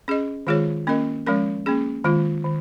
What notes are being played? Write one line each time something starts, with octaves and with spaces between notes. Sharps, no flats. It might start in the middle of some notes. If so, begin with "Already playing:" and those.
C#4 G#4 D#5
D#3 G#3 F4 G#4 C#5
A#3 C#4 A#4 D#5
F3 G#3 C#4 A#4
A#3 C#4 G#4
D#3 G#3 F4
D#3